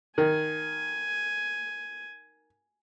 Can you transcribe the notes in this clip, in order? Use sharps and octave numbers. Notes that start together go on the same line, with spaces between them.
D#3 G#5